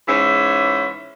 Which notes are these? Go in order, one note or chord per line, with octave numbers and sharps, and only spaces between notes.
G#2 E3 C#4 E5